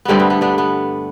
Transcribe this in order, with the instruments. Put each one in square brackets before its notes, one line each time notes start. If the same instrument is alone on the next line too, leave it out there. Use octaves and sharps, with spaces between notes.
[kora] G2 D3 G3 A3 B3 C4
B3
B3
B3 D4
B3